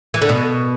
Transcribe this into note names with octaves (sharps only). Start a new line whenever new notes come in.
E3
D3
B2